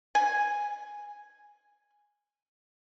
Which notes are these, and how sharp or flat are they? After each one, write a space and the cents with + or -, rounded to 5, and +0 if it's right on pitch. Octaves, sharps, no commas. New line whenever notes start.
G#5 -5